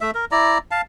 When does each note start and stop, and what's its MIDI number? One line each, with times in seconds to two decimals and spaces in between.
0.01 0.11 57
0.01 0.11 76
0.15 0.25 70
0.31 0.58 64
0.31 0.58 74
0.31 0.58 82
0.71 0.81 77
0.71 0.81 81